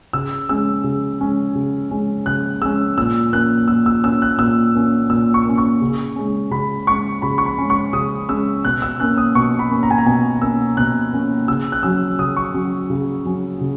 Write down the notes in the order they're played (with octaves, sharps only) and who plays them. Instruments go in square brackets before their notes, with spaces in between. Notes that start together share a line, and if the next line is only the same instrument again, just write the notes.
[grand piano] C#3 E6
G#3 C#4 E6
C#3
G#3 C#4
C#3
G#3 C#4
C#3 F#6
G#3 C#4 E6
A#2 E6
A#3 C#4 F#6
A#2 E6
E6
A#3 C#4 E6
F#6
A#2 E6
A#3 C#4
A#2 E6
C#6
A#3 C#4
C#6
C#3
G#3 C#4
C#3 B5
G#3 C#4 C#6
C#3 B5
C#6
B5
G#3 C#4
C#6
C#3 D#6
G#3 C#4 E6
B2 F#6
E6
A#3 C#4 F#6
D#6
B2 C#6
B5
A#3 C#4
A#5
G#5
A#5
B2 G#5
A#3 C#4 E6
B2 F#6
A#3 C#4
C#3 E6
F#6
F#3 C#4 E6
C#3 D#6
C#6
F#3 C#4
C#3
F#3 C#4
C#3